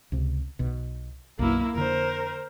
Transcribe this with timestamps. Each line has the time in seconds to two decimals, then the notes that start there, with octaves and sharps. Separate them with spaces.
0.12 C#2 C3
0.59 B1 B2
1.39 B1 F#2 B2 A#3 E4
1.75 F2 D3 A#4 C5